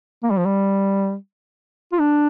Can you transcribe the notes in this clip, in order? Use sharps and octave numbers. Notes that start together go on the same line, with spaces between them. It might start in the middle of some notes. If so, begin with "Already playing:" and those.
A#3
G3
F3
G3
F4
D4